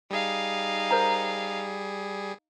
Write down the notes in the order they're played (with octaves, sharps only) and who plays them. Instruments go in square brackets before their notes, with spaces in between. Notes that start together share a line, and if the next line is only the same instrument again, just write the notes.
[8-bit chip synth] G3 G#4 [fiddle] D#4 F5
[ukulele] A#4 C5 A#5